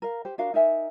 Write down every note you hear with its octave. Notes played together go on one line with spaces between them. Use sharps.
A#4 F5
G4 C5
D4 F#4 A#4 F5
D#4 A#4 E5 G#5